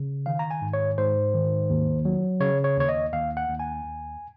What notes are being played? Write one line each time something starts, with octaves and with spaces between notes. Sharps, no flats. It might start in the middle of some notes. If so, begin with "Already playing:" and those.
Already playing: C#3
D#3 F5
A#5
G#5
G#2
C#5
G#2 C5
D#3
D#2
F#3
C#3 C#5
C#5
D#2 C#5
D#5
D#2 F5
F#5
D#2
G#5
D#2